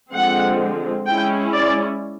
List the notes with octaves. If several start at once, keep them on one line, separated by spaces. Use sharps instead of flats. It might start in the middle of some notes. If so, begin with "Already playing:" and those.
D3 F3 G#3 C4 F#5
G#3 C#4 E4 G5
D5